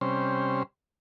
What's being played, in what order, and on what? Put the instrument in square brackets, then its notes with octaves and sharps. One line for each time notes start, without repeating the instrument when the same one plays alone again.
[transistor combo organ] C3 G3 C#4 C5